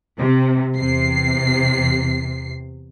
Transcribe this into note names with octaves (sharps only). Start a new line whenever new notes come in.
C3
E2 C3 C7